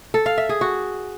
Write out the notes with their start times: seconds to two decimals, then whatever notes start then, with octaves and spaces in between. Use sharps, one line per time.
0.14 A4
0.26 F5
0.38 E5
0.49 G#4
0.61 F#4